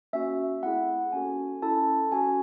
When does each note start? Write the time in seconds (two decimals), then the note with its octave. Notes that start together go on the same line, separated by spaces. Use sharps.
0.13 A#3 C#4 F#4 E5
0.63 A3 C4 E4 G#4 F#5
1.12 A#3 C#4 F#4 A4 G#5
1.62 C#4 E4 A4 A5
2.12 C#4 F#4 A4 G#5